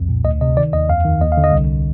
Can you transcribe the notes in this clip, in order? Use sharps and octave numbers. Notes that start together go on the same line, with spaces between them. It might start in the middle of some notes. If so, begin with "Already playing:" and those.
Already playing: C2 F2
A#2
D2 D#5
C3 D#5
D#3 D5
D#2 D#5
F2 F5
D#3
D#2 D#5
F5
D3
D#5
C2